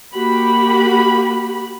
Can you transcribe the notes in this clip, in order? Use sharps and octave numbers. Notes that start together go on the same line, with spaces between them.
A#3 F#4 G4 B5